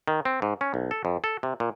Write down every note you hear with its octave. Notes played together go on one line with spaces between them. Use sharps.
D#3
C4
G#2
C#4
B1
A4
F2
A4
C3
A#2